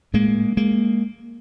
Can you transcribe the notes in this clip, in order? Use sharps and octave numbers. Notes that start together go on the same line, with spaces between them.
A2 G#3 A#3
G#3 A#3